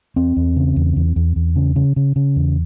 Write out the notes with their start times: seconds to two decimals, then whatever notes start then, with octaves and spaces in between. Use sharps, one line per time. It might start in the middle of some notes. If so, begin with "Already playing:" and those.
0.16 E2 C4
0.36 E2
0.56 C#3
0.76 E2
0.96 E2
1.16 E2
1.36 E2
1.56 C#3
1.76 C#3
1.96 C#3
2.16 C#3
2.36 E2